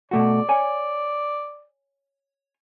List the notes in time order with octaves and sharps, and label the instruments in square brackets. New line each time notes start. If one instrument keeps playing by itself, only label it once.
[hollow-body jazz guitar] B2 A3 F#4 [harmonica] D5
[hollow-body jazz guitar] C#5 G#5